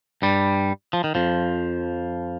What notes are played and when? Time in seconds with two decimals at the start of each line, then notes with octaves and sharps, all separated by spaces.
0.22 G2 G3
0.93 F3
1.04 D#3
1.15 F2 F3